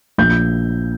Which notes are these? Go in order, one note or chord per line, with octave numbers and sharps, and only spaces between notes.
A#1 G6